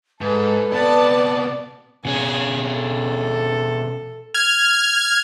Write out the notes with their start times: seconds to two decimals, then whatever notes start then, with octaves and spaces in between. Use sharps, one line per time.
0.21 G#2 A4 B4
0.72 C3 B3 D5 A5
2.05 B2 C#4 G#4 G#5
2.66 A4
4.34 F6 G#6